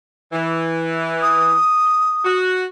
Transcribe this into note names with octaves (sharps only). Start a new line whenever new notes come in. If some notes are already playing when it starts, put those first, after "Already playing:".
E3
D#6
F#4